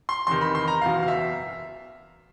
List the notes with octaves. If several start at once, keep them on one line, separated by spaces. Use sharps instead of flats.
C6
E2 C3 D#3 C6
B5
C6
A#5
F#1 E2 B2 F5
F5
E5